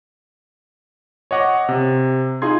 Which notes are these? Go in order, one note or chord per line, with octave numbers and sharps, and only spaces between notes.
C#5 D#5 F#5 D6 A#6
C3
D#4 F4 G#4 C6 G#6